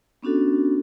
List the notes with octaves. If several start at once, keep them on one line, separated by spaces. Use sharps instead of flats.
B3 C#4 D4 F#4 A4